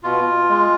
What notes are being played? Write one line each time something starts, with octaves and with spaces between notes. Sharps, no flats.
B2 F4
G#3